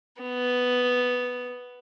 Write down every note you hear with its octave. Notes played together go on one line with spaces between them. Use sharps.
B3